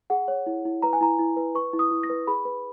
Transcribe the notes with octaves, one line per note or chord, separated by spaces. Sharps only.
G#4 F#5
C#5
E4
E4
B4 A#5
G#5
E4 A#5
E4
B4
B4 C#6
E4
D#6
E4
A#6
B4
G#4 B5
B4